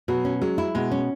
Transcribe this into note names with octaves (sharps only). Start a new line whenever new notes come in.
B2 F#3
C#4
F#3 G#3
E4
B2 G#3
C#4